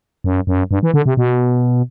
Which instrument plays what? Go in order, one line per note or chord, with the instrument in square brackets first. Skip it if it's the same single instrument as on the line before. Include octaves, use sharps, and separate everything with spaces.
[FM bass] F#2
F#2
G2
E3
D3
C3
B2